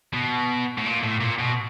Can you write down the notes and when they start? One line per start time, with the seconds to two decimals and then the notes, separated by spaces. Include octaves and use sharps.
0.14 B2
0.78 A2
0.85 A#2
1.03 A2
1.21 A#2
1.39 B2